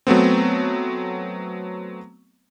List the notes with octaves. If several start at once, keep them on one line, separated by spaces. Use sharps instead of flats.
F#3 A3 B3 C4